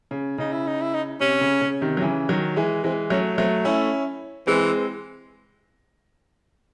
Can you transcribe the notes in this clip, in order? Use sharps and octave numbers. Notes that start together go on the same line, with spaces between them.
C#3
C#3 D#4
E4
D#4
E4
D#4
C3 C#4
C#3
C#3
C3 D#3
F#3
C#3 E3
D#3 F#3
E3 G#3
E3 G#3 C4
F#3 A3 C#4
F#3 A3 C4
A3 C#4 E4
E3 G#3 C4